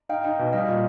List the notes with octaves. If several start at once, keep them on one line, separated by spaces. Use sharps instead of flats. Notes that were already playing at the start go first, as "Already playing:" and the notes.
D#4 F5 G5
D#4
B2
G3 D#5 F5
A#2